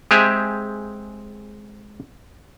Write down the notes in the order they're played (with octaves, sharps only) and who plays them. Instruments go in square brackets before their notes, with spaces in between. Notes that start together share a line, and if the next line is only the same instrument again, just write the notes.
[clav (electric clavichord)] G#3 C4 G4 G#4 E5